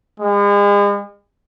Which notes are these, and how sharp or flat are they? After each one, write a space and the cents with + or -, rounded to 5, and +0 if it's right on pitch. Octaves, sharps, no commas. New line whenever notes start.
G#3 -40